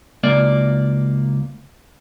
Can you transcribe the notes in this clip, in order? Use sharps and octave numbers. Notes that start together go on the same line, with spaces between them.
C#2 A#3 D5